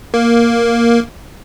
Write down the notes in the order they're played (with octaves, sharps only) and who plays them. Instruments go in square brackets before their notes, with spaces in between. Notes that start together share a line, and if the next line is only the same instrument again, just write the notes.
[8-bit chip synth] A#3